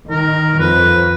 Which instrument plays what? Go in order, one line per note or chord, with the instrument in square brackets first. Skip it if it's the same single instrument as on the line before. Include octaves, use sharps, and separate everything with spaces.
[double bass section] D#3 [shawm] A#4
[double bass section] F2 [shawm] B4